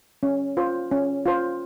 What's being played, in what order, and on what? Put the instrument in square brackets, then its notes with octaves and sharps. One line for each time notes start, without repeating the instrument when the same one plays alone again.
[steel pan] C#4
F4 C5
C#4
F4 C5